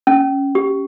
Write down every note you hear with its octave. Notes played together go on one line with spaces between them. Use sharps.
C#4
G4